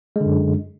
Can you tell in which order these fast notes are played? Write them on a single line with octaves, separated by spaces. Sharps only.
G#3 D3 F#2